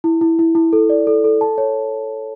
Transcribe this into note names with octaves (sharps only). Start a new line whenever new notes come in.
E4
E4
E4
E4
A4
D5
A4
A4
A5
C#5